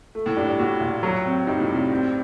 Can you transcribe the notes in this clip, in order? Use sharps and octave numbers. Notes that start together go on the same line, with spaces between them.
A3
A2
G2 D4
G2
A2 F#4
A#2
F#3
C4
G2 D#4
A2
C3
G2
C4